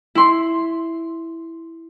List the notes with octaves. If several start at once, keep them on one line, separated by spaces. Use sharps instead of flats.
E4 C6